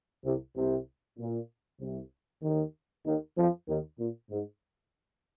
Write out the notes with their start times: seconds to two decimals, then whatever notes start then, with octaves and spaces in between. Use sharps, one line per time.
0.24 C2 C3
0.56 C2 C3
1.19 A#2
1.80 C2 C3
2.42 D#2 D#3
3.05 D#2 D#3
3.36 F2 F3
3.67 D#2 D#3
3.98 A#2
4.30 G#2